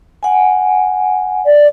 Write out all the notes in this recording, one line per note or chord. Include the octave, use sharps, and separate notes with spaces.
F#5 G#5
D5